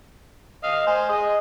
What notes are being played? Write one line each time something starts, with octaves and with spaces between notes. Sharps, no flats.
D#5 F5
C5 G#5
G#4 D#5